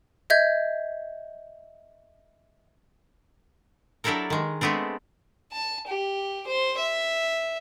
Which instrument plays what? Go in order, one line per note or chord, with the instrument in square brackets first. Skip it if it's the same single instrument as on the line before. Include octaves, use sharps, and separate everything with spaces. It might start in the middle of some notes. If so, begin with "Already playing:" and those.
[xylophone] D#5 E5 G6 G#6
[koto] F#3 D4 E4 G4 A4 A#4
D#3 G#3
G#3 A3 B3 C4 D4
[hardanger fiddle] A5
G4
C5
E5